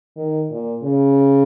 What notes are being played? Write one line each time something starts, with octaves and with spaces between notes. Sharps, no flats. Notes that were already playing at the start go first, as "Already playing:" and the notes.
D#3
A#2
C#3